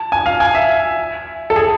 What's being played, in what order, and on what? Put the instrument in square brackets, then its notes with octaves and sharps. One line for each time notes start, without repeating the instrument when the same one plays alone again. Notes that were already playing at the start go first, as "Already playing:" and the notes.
Already playing: [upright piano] A5
G#5
F5
G#5
E5
A4
G#4